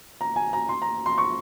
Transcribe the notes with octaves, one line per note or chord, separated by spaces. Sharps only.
A#5
G#5
A#5
C6
A#5
C6
C#6